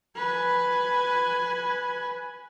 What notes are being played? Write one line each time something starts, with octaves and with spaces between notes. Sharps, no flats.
B4 G#5